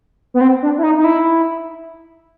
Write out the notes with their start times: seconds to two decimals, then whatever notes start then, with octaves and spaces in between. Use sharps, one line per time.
0.34 B3
0.41 C4
0.63 D4
0.78 E4
0.83 D#4
0.97 D#4
1.04 E4